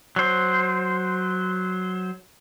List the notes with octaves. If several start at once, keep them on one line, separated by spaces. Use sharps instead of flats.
F#3 C5